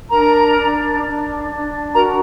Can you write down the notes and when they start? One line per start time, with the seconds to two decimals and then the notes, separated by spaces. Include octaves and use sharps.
0.11 D4 A#4 A#5
0.56 D4
1.02 D4
1.48 D4
1.93 F#4 A#4 A#5